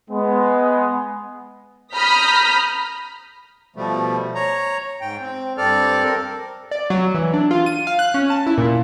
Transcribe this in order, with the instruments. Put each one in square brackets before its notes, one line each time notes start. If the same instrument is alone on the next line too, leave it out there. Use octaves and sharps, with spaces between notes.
[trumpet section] G#3 B3
[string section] A#5 B5 D#6 F6 G6 B6
[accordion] B2 F3 G3 A3
C#5 A#5
G#2 G5
C4
G2 C4 A4 D5 F6
C4 A4 A#4
[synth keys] D5
F#3
E3
D4
F4
D#7
F5
F#6
C#4
A5
E4
A#2